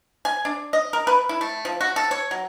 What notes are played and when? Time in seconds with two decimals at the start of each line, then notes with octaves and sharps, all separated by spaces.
0.25 G#5
0.45 D4
0.73 D#5
0.93 A#4
1.07 B4
1.29 E4
1.41 A3
1.65 F3
1.81 F#4
1.96 A4
2.11 C#5
2.31 F#3